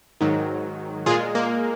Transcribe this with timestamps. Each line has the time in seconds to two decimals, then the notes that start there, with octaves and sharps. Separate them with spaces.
0.21 G#2 D#3 F#3
1.06 A#2 G#3 F4 G#4
1.35 A#3